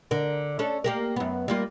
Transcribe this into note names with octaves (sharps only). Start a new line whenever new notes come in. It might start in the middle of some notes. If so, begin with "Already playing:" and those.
D3 A#4
C#4 D4 A4
A#3 G4 A#4
F#2 B3
G3 A#3 F4